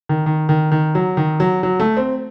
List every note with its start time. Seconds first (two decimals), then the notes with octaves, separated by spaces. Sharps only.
0.09 D#3
0.26 D#3
0.49 D#3
0.72 D#3
0.95 F#3
1.17 D#3
1.40 F#3
1.63 F#3
1.80 A3
1.97 C4